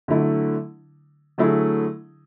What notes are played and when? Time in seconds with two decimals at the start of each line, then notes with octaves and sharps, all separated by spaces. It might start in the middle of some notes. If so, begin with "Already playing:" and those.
0.08 D3 F#3 A3 E4
1.38 D3 F#3 A3 E4 G#4